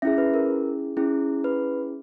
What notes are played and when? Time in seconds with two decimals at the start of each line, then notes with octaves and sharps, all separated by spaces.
0.02 C#4 E4 G#4 E5
0.18 B4
0.33 A#4
0.97 C#4 E4 G#4
1.44 B4